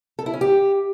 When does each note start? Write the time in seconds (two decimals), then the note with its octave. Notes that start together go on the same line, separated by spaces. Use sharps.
0.19 A4
0.26 E4
0.34 C#4
0.41 G4